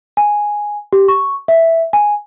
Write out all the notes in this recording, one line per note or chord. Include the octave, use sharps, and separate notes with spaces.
G#5
G4
C#6
E5
G#5